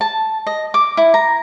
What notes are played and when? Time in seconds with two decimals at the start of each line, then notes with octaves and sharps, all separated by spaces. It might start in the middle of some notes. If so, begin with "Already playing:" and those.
0.01 A5
0.47 D#5
0.74 D6
0.97 E4
1.14 A#5